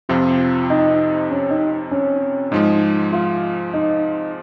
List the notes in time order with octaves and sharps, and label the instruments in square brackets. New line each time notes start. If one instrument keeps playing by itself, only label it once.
[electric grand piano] F2 C3 F3 C4 [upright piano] F4
[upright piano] D#4
C#4
D#4
C#4
[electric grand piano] G#2 F3 G#3 [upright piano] D#4
[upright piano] F4
D#4